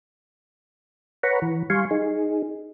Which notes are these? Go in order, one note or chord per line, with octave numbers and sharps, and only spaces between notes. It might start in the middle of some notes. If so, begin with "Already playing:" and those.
B4 C#5 F#5 A#5 B5 C#6
E3
G3 F5 G#5 C6 C#6
D#4 G#4